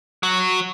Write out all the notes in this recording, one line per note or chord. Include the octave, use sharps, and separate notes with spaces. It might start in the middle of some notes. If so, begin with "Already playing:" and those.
F#3